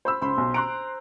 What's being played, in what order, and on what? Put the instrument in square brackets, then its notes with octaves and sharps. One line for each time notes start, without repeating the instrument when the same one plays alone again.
[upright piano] C5 B5 E6
[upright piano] C#2 B5 [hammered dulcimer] C5
[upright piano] B1
[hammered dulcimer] A#5 [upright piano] C6 F#6 D7